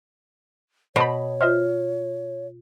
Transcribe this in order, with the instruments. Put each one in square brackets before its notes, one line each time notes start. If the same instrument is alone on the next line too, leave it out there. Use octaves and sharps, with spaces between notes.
[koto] B2 [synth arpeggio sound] C5 A5 B5 [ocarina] C#5
[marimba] F4 F6 [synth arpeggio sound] C5 D#5 E5